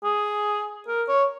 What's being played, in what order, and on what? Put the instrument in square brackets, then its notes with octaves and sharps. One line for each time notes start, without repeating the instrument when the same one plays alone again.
[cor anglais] G#4
A#4
C#5